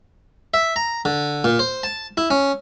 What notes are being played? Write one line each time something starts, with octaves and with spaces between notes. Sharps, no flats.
E5
A#5
D3
A#2
C5
A5
E4
C#4